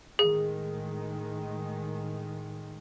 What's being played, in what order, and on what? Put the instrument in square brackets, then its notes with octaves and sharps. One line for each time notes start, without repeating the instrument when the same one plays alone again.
[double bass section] A2 D#3 G#3 [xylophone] G#4